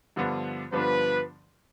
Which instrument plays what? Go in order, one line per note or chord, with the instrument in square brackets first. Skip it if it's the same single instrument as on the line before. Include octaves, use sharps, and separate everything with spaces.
[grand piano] G2 D3 F3 B3 D4
[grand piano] G2 D3 F3 B3 D4 [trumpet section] B4